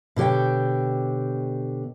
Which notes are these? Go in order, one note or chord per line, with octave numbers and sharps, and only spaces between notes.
B2 D3 G4 C#5 G5